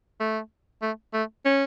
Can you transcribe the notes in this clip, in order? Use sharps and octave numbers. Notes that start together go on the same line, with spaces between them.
A3
A3
A3
C#4